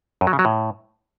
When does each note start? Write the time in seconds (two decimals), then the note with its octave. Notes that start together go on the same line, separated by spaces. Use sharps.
0.21 F#2
0.27 F#3
0.33 C#3
0.39 F#3
0.45 A2